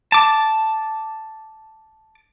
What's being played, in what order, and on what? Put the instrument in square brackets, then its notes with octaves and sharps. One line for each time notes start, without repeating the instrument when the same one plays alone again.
[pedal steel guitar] A5 D6